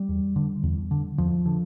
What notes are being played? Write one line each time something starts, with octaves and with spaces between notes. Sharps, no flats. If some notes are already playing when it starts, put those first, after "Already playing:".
Already playing: G3
E2
D3
E2
D3
E2 F3
D3